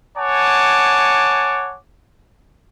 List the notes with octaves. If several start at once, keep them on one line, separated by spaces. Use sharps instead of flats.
C#5 F#5 G#5 A5 D6